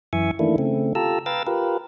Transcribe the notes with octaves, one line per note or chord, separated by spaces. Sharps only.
F#2 E3 E5 G#5 C#6
D#3 E3 A3 A#3 D4 E4
C#3 A3 C4
F4 G4 A4 A5 A#5 E6
B4 F5 G5 A#5 E6 A6
F4 G4 A#4 B4